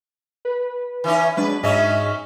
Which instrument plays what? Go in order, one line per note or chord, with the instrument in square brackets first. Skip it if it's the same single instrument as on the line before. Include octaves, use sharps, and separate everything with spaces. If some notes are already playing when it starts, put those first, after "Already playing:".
[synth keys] B4
[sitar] E3 C#4 D#4
[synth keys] F#3 G#3 D4 [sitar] B4
[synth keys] G#2 D#5 [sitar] F#3 C#4 E5